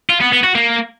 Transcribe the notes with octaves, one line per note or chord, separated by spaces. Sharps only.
F4
B3
B3
F#4
A#3